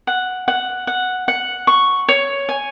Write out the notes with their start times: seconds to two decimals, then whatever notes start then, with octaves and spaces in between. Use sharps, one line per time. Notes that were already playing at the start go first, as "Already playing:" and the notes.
0.07 F#5
0.48 F#5
0.87 F#5
1.28 F#5
1.67 C#6
2.09 C#5
2.49 G#5